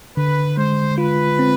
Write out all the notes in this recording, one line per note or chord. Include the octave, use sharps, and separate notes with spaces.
D3 B4
G#3 C5
F4 B4
C4